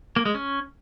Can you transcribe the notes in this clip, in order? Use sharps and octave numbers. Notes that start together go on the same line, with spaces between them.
A#3
G#3
C#4